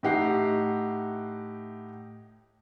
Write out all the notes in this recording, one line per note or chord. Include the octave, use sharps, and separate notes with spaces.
A2 D#4 G4 F#5 C7